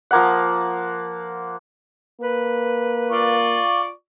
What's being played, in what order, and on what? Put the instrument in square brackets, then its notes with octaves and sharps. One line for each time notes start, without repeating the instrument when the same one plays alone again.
[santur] F3 A#3 F#5
[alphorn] A#3 [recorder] B4
[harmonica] F4 D5 C#6